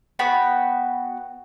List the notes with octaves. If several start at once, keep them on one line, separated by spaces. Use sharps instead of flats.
B3 F#4 G5 B5